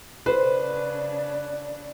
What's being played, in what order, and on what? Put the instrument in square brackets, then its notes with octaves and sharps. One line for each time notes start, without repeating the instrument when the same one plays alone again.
[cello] C#3 D4 [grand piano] B4 [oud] C5